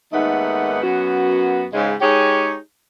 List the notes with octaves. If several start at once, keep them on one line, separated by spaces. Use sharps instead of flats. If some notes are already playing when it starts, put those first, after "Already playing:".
D#2 G#2 A3 B3 D#4 F#5
F#2 B3 F#4
G#2 C#3 G#3
G#3 D#4 G4 G#4 C#5